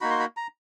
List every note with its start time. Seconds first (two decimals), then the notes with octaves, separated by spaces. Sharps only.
0.01 A#3 D#4 F#4 B5
0.10 C6
0.20 B5
0.37 A#5